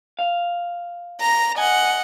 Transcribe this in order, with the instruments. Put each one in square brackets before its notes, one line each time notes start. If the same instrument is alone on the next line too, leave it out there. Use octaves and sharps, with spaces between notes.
[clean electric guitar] F5
[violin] A#5 A#6
[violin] D#5 F#5 [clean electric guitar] G#5